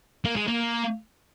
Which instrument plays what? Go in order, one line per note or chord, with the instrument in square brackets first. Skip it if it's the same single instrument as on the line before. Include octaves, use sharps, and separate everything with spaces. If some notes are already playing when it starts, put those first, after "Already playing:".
[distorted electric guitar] A#3
G#3
A#3